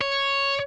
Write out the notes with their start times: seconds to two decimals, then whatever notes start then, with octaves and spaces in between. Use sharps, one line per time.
0.01 C#5